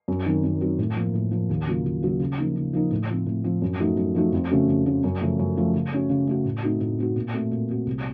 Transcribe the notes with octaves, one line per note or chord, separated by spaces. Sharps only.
F#2
D#3 F#3 C4 D#4
F#2
D#3 F#3 C4 D#4
A2
F3 A#3
A2
F3 A#3
D#2
C#3 F#3 A#3 F4
D#2
C#3 F#3 A#3 F4
C#3
F3 A#3 D#4
C#3
F3 A#3 D#4
A2
F3 C4
A2
F3 C4
F#2
F3 A3 D#4 F#4
F#2
F3 A3 D#4 F#4
F2
C#3 A3 C#4 F#4
F2
C#3 A3 C#4 F#4
F#2
C#3 F3 A3
F#2
C#3 F3 A3
C#3
A3 C#4 F#4
C#3
A3 C#4 F#4
A2
A3 C4 D#4 F#4
A2
A3 C4 D#4 F#4
A#2
A3 C4 F#4
A#2
A3 C4 F#4
C2